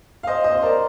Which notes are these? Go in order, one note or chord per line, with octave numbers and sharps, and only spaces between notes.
F5
C5 D#5
C5 D#5
C5
A#4 D5